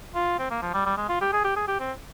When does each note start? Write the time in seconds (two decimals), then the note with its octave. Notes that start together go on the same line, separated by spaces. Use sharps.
0.15 F4
0.39 C4
0.50 A#3
0.62 F3
0.74 G3
0.86 G3
0.97 G#3
1.09 F4
1.21 G4
1.33 G#4
1.44 G4
1.56 G#4
1.68 G4
1.80 C4